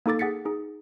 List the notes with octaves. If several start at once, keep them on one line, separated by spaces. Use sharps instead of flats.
A#3 D#4 A4 D6 A6
G#4 F#5 A6 B6 C#7
D#4 G#4